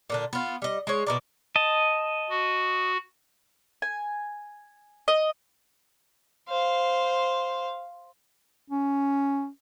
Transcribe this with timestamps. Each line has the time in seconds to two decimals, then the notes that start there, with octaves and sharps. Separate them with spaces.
0.10 A#2 D3 D4
0.33 B3 F4
0.62 G3 D#5
0.87 G#3 C#5
1.07 B2 A#4 D5
1.56 D#5 A5
2.30 F#4
3.82 G#5
5.08 D#5
6.48 C5 F5
8.70 C#4